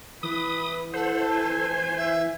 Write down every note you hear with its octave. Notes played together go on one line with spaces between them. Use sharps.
E3 B4 D#6
A4 C5 F#5
G#5
E5